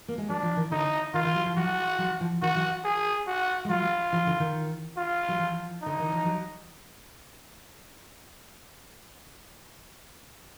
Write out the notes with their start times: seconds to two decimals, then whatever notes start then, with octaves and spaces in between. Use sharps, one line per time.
0.08 A#3
0.18 G#3
0.29 F#3 D4
0.43 F3
0.57 D#3
0.71 D3 D#4
1.14 D#3 F4
1.25 D#3
1.35 F#3
1.46 F3
1.57 F#3 F#4
1.98 F#3
2.21 F3
2.42 D#3 F#4
2.56 F#3
2.84 G#4
3.27 F#4
3.65 G#3
3.69 F#3 F4
4.12 F3
4.27 D3
4.40 D#3
4.97 F4
5.28 F#3
5.39 F3
5.82 D3 D#4
5.99 D#3
6.12 F3
6.25 F#3